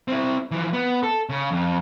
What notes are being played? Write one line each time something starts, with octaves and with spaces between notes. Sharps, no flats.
C4 E4
E3 F3
B3
A4
C#3
F2